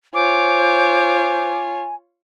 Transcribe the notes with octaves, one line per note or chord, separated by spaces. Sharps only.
F4 C5 C#5 G#5 D6